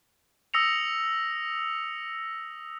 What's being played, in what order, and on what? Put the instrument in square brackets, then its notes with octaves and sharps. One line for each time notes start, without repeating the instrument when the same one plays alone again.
[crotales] D#6 E6 A#6 C#7 F7